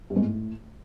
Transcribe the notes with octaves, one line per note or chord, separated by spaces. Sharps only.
G2
G#2
A2